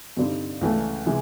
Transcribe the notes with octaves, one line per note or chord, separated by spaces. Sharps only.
G2 D3 G3 C4 D#4
C#2 C#3 E3 A3
C3 E3 G#3